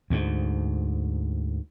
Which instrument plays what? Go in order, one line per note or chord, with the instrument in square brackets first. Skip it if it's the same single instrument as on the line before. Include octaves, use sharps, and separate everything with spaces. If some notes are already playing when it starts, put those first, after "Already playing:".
[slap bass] D2 G#2